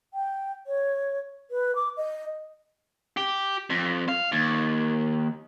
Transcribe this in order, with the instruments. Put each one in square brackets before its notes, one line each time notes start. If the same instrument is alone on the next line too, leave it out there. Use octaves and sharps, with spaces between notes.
[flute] G5
C#5
B4
D6
D#5
[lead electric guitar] G4
F2
F5
D#2